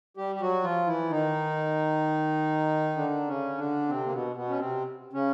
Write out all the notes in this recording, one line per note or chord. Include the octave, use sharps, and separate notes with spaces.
G3 G4
G4
F#3 F#4
F3 F4
E3 E4
D#3 D#4
D3 D4
C#3 C#4
D3 D4
C3 C4
A#3
B2 B3
B2 B3
C#4
C3 C4
C#3 C#4